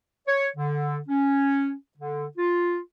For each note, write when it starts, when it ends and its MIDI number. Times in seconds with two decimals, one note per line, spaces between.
0.28 0.47 73
0.57 0.98 50
1.09 1.72 61
1.98 2.27 50
2.38 2.78 65